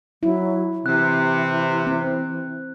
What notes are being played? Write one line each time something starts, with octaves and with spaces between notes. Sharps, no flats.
F#3 E4
C3 E3 F#6
C4